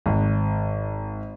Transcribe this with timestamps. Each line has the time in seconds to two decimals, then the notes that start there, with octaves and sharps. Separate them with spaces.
0.06 G#1